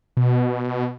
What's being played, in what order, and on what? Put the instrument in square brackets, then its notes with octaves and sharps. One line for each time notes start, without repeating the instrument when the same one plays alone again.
[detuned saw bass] B2